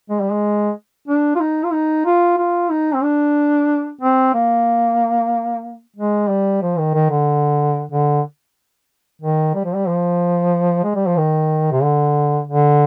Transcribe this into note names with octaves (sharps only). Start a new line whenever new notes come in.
G#3
G3
G#3
D4
F4
D#4
F4
D#4
F4
F4
D#4
C4
D4
C4
A#3
G#3
G3
F3
D#3
D#3
D3
D3
D#3
G3
F3
G3
F3
G#3
G3
F3
D#3
C3
D3
D3